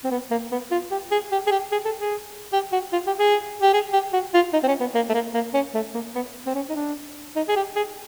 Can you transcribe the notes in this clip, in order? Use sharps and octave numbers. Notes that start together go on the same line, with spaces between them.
C4
B3
A#3
B3
F4
G4
G#4
G4
G#4
G4
G#4
A4
G#4
G4
F#4
F4
G4
G#4
G4
G#4
G4
F#4
F4
D#4
C4
C#4
B3
A#3
A3
A#3
A#3
C#4
A3
A#3
B3
C4
C#4
D#4
D4
D#4
G#4
G4
G#4